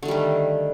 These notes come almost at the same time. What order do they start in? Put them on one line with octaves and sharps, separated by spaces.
D3 A3 G3 D#3